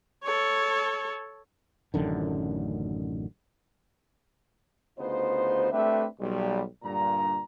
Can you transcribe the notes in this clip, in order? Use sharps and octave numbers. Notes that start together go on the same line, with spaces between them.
A4 C#5
A1 F#2 D3 D#3
D2 C#3 B3 D#4 F4 C5
A3 C4 D4 G4 B4 E5
B1 G3
G2 A#2 D3 A#5